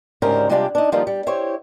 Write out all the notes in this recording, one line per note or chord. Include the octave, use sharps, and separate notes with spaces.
D2 G#2 C#3 G3 A#4 C5
C3 G3 G#3 D4 F4 G4
D4 D#4
D#3 F3 G3 A#3 D#4 F4
G3
E4 G4 C5 C#5